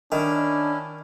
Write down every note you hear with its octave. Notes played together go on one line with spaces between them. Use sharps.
D#3 C#4 D4 E4